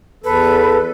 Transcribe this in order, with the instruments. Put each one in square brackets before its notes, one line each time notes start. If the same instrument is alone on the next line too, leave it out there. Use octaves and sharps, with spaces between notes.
[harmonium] E2 A4 [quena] B4